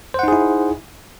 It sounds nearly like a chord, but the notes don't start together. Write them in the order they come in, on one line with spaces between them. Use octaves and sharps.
C5 F#5 D#4 G#4 E4